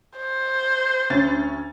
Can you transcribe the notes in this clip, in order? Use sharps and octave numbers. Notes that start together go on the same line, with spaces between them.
C5
D2 C#4 A6